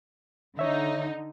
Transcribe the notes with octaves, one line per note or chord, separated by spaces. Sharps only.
D3 D#4 C#5 E5